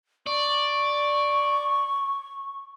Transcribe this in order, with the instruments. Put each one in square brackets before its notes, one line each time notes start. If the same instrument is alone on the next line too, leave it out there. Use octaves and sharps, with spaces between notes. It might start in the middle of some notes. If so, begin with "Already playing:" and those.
[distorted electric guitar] D5 [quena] C#6